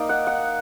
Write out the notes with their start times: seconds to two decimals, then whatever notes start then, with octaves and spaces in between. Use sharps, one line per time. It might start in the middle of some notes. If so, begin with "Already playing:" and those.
Already playing: A#3 D#4 D5
0.09 F#5
0.27 F#5